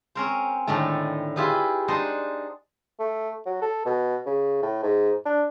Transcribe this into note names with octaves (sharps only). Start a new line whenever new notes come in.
C4 C#4 A#4 C5
A2 D3 D#3 A3
E4 F4 G4 G#4 B4
D4 D#4 C5 D#5 F#5
A3
F#3
A4
B2
C#3
A2
G#2
D4